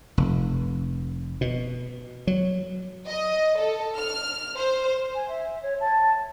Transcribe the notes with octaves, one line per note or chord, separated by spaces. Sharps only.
F1
B2
F#3
D#5
A4
F6
C5
G#5
E5
C#5
A5